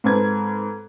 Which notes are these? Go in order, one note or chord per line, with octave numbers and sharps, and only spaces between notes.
G#2 C4 A4 B4 G#6